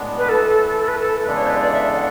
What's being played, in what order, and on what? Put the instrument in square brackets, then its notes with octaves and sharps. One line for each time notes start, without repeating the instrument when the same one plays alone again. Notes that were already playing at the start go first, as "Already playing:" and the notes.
Already playing: [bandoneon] A2 G#3 B3 D4
[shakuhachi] B4
[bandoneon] E3 A3 E4 [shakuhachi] A4
[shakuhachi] A4
B4
A4
[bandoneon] E2 C#3 G#3 D4 A4 [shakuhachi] B4
[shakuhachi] C#5
B4
D5
E5
F#5